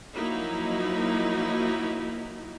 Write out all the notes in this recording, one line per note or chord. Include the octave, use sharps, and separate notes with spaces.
F3 F#3 A#3 D#4 E4